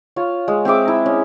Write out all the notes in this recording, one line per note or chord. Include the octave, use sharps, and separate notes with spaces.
F4 C#5
G#3
C4 G#4 E5 D6
E4 A#5
C#4